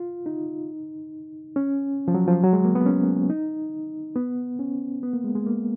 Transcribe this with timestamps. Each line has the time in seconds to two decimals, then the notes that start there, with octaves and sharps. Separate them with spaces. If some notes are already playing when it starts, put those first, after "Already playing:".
Already playing: F4
0.26 D#4
1.56 C#4
2.08 F3
2.14 F#3
2.28 F3
2.43 F#3
2.53 G#3
2.65 A#3
2.75 B3
2.86 C#4
3.30 D#4
4.16 B3
4.59 C#4
5.03 B3
5.13 A#3
5.24 G#3
5.35 G#3
5.46 A#3